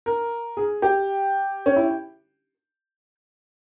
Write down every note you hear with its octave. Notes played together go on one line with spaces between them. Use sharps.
A#4
G#4
G4
C#4
E4